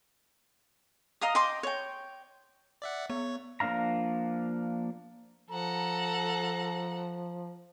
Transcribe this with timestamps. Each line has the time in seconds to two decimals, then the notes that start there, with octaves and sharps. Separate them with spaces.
1.21 D#5 F5 A#5 D#6
1.35 D#5 G5 C6 D6
1.63 C#5 G5
2.82 D5 E5 F#5
3.10 B3 C#5
3.60 F3 A#3 D4 F5 A#5
5.50 F3 A4 F#5 A#5